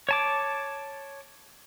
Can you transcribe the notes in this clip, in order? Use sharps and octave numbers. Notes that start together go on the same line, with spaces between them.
C#5 A5 D6